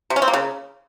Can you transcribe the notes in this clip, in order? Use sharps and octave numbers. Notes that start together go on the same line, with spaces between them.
C3
C#4
C4
A#3
C#3